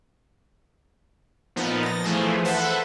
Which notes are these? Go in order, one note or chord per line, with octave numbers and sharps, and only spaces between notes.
A#2 F3 B3 D#4
A6 A#6
E3 F3 A3 G#4 C5
A4 B4 C5 E5 F#5